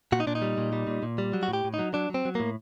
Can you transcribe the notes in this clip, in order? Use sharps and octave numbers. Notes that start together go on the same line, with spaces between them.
A#2 F#4
D#4
A#2 D4
D#4
G3
A#2
G3
A#2
A#2
G3
F#3
F#4
A2
G4
A2
D#4
F#3
F#3 D4
F#3 C4
F#3
A2 A#3